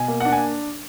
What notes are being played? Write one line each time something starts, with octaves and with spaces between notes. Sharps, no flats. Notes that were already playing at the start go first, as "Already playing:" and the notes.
Already playing: B2 G#5
A#3
D4 F#5
G#5